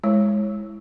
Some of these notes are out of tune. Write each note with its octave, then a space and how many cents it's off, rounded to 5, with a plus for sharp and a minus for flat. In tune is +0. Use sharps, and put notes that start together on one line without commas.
G#3 +0 E4 +0 C#5 -20